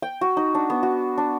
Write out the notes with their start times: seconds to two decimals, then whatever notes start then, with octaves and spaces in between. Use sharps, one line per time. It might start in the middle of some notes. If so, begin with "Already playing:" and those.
0.02 G5
0.21 F#4
0.37 D#4
0.55 D4
0.70 B3
0.83 F#4
1.18 D4